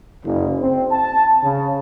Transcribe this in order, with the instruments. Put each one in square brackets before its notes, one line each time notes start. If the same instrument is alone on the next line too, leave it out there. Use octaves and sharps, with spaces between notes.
[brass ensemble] F#1
C4
A5
C#3